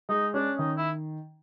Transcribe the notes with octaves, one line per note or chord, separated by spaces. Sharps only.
G#3 D#4
C#4 D4
D#3 D#4
E4